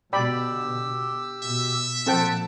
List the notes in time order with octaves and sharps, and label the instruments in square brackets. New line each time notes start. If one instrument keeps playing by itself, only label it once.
[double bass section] B2 D3 [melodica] G4 E6 [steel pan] D5 G5 B5
[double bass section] B2 [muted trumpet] E5
[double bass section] A#2 F3 [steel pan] C4 A4 G5 [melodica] F#5 A5